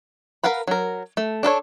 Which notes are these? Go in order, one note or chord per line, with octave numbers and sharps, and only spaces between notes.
A#4 B4 F5 F#5 B5
F#3 A#4
A3
D4 A4 B4 C#5